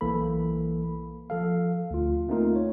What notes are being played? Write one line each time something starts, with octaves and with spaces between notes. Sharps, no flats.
B1 E3 A#3 A4 B5
F3 A4 F5
D2 F4
A3 A#3 C4 D#4 F4 A#4
C#5